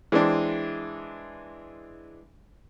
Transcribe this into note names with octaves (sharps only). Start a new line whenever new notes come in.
E3 G#3 C4 D4